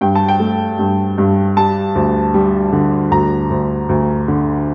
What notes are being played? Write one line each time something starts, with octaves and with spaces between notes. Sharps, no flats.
G2 G5
A5
G5
A3
G2
G2
G3 A5
D2
G3
D3
D2 A#5
D2
D2
D3